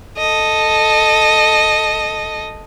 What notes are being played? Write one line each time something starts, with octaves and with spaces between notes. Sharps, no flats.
A4 D#5